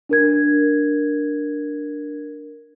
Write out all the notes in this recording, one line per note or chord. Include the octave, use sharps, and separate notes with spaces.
D4 A#4 G#6